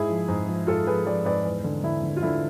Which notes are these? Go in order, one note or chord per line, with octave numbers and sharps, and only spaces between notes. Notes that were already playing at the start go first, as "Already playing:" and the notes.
Already playing: G#2 E4 G#4
F3
G#2
F3
G#2 F4 A4
F3 G#4 B4
F3 B4 D5
G#2 B4 D5
E2
D3
D3 E4
D3
F4
D3 E4